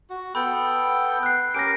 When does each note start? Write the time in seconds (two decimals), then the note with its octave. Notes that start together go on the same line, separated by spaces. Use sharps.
0.10 F#4
0.35 B3 A4 G5 B5
1.23 F#6 C7
1.54 C#4 G4 A#4 A#6 D7